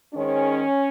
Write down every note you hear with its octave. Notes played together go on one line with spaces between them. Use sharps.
G#2 D#3 G#3 C#4